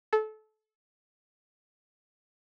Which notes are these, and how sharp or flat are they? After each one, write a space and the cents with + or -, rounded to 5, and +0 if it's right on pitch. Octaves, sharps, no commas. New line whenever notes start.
A4 -25